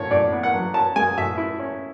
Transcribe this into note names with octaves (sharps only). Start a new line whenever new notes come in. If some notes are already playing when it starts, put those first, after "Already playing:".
Already playing: A2 C#5
A2 D5
B3
F#5
F#3
C#4 A5
G#3 G#5
A2 E5
E4
C#4